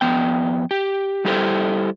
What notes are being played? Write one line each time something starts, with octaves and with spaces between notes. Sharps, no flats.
F2 B3 G5
G4
G3 E4 G4 A4 C5